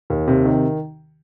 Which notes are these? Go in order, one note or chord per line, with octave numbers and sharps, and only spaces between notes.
D#2
C3
D#3